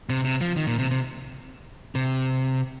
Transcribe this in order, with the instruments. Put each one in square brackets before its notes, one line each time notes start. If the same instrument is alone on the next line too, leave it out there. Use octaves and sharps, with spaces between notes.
[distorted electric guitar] C3
C3
F3
D#3
A#2
C3
C3
C3